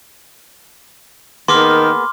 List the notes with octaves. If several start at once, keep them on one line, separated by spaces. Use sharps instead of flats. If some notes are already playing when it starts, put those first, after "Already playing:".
D#3 A#3 B3 G#4 C6 D6 F6